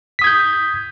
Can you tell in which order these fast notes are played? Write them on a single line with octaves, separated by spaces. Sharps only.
B6 D#6 G#6 G6